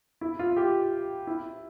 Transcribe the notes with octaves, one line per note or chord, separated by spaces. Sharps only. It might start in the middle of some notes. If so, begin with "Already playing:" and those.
E4
F4
G4
E4